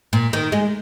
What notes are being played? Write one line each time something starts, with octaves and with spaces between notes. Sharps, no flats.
A#2
D#3
G#3